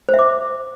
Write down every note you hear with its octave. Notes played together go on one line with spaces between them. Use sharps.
C5
E5
D6